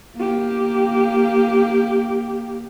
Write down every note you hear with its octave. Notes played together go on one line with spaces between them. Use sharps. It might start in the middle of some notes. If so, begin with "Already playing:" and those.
A#3 G4